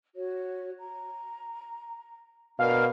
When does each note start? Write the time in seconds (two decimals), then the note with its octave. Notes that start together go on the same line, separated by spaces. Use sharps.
0.16 F#4 C#5
0.79 A#5
2.59 B2 D4 A#4 D5 F5